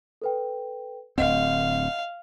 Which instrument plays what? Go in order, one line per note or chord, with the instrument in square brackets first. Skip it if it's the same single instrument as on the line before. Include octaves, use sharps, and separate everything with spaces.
[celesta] A4 B4 G5
[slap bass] D1 D2 C4 [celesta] D#5 F#5 [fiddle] F5